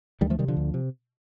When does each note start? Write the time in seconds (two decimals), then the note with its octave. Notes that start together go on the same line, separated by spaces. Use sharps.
0.21 D2 D#3 G3
0.30 F3 A3
0.39 C3 D#3 G3
0.48 D3 F3
0.57 D2
0.74 C3